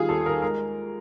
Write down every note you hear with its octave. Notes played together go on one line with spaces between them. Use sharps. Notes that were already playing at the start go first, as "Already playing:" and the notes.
Already playing: D#3 G3 F4 G#4
D#2 A4
D#3 A#4
G#3 A#4